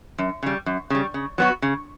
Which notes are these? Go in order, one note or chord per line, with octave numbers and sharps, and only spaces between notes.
F#2
C#3 G3
F#2
C#3 G3
C#3
F#3 B3 F#4
C#3